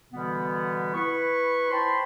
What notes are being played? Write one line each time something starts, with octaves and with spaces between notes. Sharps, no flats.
B2 D3 E3 G3 B3
E4 B4 C#6
C5 D5 G5 A5 B5 C6